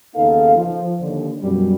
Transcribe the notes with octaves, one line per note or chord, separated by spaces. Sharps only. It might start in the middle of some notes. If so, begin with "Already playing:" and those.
D#2 C#3 B3 D#4 A4 F5
F3
D#2 D3
F#2 B2 G3